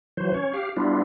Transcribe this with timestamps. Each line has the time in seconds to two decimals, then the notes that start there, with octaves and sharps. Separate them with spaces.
0.17 E3 F#3 C5
0.34 C#4 C#5
0.54 G4 F5
0.76 G3 B3 D4 E4 F4